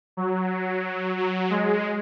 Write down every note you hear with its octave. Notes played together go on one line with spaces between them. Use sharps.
F#3
F#3
G#3